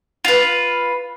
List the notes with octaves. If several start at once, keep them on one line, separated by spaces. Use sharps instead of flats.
F4 B4